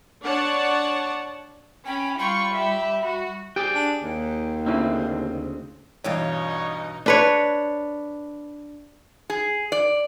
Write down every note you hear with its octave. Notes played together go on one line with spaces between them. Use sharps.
D4 C#5 D5 F#5 A5
C#4 G5 B5
G3 F4 G5 B5 C#6
G4 E5
F#4
G4 G#4 D5 G5
D4
D#2
D2 C#3 A#3 C4 C#4 E4
G2 B2 E3 D#4 C#5 D5 F5 G5
D4 B4 C#5
G#4
D5